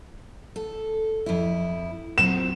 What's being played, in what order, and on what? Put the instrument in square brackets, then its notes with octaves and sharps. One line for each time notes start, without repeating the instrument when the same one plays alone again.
[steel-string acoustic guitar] A4
F2 E4
[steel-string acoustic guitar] F#3 C4 F4 [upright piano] E7